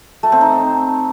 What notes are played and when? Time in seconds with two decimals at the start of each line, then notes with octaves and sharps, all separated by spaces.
0.23 A3
0.32 C4
0.41 D#4